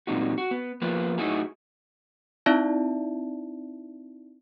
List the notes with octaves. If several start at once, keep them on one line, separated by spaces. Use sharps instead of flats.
F#2 A#2 G#3 C4 D#4 F#4
F#4
B3
F3 A#3 B3 F4 B4
A2 F#3 D#4 E4 F#4 G#4
C4 D#4 E4 D5 E5 A5